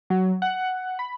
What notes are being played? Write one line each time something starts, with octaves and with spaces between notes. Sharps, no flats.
F#3
F#5
B5